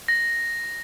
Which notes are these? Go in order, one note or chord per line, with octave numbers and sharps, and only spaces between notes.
A#6